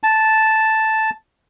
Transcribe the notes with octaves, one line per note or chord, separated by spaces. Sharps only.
A5